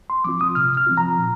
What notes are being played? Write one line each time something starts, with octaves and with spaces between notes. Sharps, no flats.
C6
F3 C4 F4 D6
D#6
C3 F6
F6
F3 C4 F4
A#5
A#2